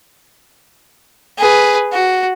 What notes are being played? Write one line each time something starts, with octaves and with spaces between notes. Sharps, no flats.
G#4 B4
F#4